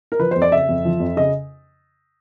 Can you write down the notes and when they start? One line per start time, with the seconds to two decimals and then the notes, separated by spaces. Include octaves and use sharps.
0.12 A#4
0.19 F3 B4
0.31 F2 C5
0.42 D5
0.52 C#3 E5
0.69 F2
0.85 F3
1.00 F2
1.17 C#3 D#5